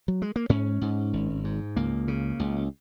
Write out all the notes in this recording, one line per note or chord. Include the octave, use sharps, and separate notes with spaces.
F#3
G#3
A#3
G#2 C#4
G#2
G#1
G#2
C#2 A#3
C#3
C#2